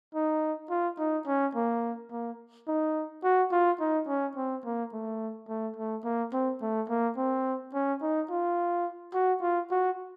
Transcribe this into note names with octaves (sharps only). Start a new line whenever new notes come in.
D#4
F4
D#4
C#4
A#3
A#3
D#4
F#4
F4
D#4
C#4
C4
A#3
A3
A3
A3
A#3
C4
A3
A#3
C4
C#4
D#4
F4
F#4
F4
F#4